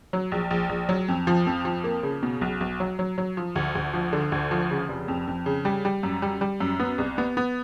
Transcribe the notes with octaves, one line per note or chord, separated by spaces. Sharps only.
F#3
A#1
A#1
A#1
F#3
F2
F3
F2
F3
A#3
C#3
B2
B1
B1
F#3
F#3
F#3
F3
D2
D2
F3
D3
D2
F3
C#3
F1
F2
F2
C#3
G3
G3
F#2
G3
G3
F#2
B3
C2
B3
B3